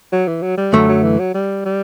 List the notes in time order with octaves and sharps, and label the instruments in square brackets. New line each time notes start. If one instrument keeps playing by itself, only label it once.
[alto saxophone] F#3
E3
F#3
G3
[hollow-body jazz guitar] F#2 D3 A3 [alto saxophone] F#3
[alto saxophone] F#3
E3
F#3
G3
G3